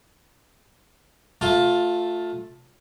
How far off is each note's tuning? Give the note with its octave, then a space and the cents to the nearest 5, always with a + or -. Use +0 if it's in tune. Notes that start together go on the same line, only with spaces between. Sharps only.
A3 +0 F4 +20 A5 +0